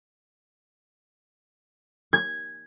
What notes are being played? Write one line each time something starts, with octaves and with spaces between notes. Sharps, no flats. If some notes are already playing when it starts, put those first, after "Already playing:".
G#6